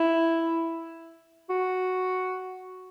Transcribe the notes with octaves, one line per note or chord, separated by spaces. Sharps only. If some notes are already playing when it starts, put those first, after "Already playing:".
Already playing: E4
F#4